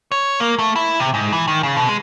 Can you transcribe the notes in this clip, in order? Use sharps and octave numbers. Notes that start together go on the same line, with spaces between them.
C#5
A#3
A3
E4
C3
G#2
E3
D#3
C#3
B2
G#3